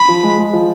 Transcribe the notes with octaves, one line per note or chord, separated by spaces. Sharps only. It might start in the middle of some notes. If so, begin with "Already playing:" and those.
Already playing: B5
F3
G#3
G#3
F3